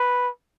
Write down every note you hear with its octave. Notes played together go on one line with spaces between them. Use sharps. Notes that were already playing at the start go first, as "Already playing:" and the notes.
Already playing: B4